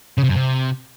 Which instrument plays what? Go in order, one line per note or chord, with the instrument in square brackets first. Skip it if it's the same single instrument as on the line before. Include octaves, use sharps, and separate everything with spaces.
[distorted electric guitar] C#3
C3
F#2
C3